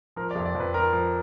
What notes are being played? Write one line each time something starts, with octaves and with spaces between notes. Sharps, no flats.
F3 A#4
D5
F2
D5
F2
B4
F3 A#4
F3